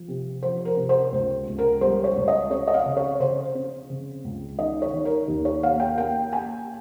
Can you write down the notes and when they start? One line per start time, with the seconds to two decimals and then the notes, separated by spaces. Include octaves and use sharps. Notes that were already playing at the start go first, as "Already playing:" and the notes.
Already playing: F3
0.08 C3
0.43 F3 C5
0.65 A#4
0.77 C3
0.89 C5
1.12 C#2
1.47 C#2
1.58 A#4
1.81 G3 C5
2.04 C#5
2.16 C#2
2.28 D#5
2.50 C4 C#5
2.68 D#5
2.74 F5
2.86 C#3
2.97 C#5
3.20 C#3 C5
3.55 C4
3.90 C#3
4.24 C#2
4.59 D#3 D#5
4.82 C#5
4.93 D#3
5.05 A#4
5.28 D#2
5.45 C#5
5.63 A#3 F5
5.80 G5
5.98 A#3 G5
6.32 A#3 G#5